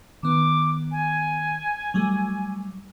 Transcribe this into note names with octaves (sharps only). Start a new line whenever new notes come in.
D#3 B3 D6
G#5
F#3 G3 A3